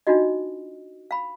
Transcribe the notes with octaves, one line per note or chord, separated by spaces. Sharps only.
D4 D#4 F4 F#4 D#5
F5 B5